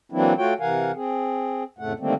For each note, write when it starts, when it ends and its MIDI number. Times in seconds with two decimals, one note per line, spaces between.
0.12 0.34 52
0.12 0.34 54
0.12 0.34 58
0.12 0.34 60
0.12 0.34 62
0.12 0.34 64
0.38 0.54 57
0.38 0.54 65
0.38 0.54 66
0.38 0.54 73
0.38 0.54 79
0.60 0.92 48
0.60 0.92 52
0.60 0.92 70
0.60 0.92 77
0.60 0.92 78
0.60 0.92 80
0.94 1.64 60
0.94 1.64 68
1.79 1.93 41
1.79 1.93 45
1.79 1.93 49
1.79 1.93 57
1.79 1.93 78
2.00 2.14 50
2.00 2.14 51
2.00 2.14 55
2.00 2.14 57
2.00 2.14 58
2.00 2.14 60